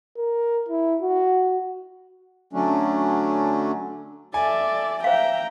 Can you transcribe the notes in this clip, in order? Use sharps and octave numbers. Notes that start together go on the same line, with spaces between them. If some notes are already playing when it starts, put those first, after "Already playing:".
A#4
E4
F#4
D3 F#3 A3 C#4 D4
A4 D5 E5 G#5
C5 E5 F5 G5 A#5